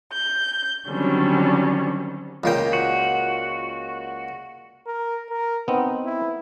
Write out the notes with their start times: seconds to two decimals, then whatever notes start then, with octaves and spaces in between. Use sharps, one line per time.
0.11 G6
0.88 D3 D#3 F#3 G3 C4 C#4
2.44 C#2 A#2 G5
2.73 F#4
4.86 A#4
5.30 A#4
5.68 B3 C4 D#4
6.05 E4